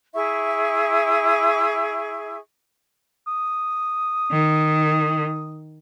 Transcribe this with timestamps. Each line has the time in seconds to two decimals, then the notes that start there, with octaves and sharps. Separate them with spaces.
0.14 E4 G#4 E5 C#6
3.27 D#6
4.31 D#3